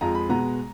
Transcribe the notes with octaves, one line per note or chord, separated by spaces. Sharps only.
F2 F3 G#3 A#5
B5
B2 G#3 B3 A#5